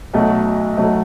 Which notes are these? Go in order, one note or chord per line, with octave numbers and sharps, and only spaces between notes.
B1 B2 F#3 A3
B1 B2 F#3 A3